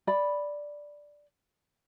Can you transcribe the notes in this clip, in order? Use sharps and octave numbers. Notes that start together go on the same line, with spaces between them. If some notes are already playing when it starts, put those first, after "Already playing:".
D5 B5